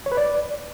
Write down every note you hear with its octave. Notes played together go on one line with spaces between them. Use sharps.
C#5
B4
D5